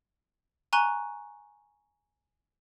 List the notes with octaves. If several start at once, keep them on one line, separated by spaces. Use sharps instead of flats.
G#5 A#5 C#6 F#6 D#7 G7